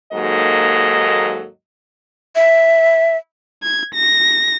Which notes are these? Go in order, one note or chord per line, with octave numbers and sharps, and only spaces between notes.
D#2 G#2 F#3 A#3 A4 D#5
E5
G#6
A#6